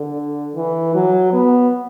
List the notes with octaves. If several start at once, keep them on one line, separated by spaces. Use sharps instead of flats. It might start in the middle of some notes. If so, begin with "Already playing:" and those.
Already playing: D3
E3
F#3
B3